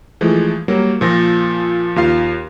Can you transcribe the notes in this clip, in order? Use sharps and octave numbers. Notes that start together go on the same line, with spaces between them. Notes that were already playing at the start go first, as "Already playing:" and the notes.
E3 F3 G#3 A3
F#3 G3 A#3
A#2 F3 A#6
D#2 F4 F5